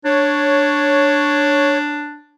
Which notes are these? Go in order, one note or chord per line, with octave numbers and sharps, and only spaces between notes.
D4 C#5